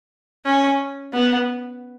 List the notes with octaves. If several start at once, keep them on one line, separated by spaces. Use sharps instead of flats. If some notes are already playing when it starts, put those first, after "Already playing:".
C#4
B3